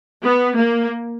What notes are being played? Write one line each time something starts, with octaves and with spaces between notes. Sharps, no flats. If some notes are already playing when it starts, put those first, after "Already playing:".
B3
A#3